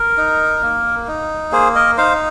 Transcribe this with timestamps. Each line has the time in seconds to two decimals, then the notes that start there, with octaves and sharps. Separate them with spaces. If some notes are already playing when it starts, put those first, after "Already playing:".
Already playing: A#4
0.17 D#4
0.63 A#3
1.07 D#4
1.52 A#3 G#4 C5
1.75 A#4 D#5
1.97 D#4 C5 F5